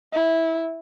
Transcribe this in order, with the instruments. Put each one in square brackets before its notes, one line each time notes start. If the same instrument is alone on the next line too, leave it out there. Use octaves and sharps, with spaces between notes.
[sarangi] E4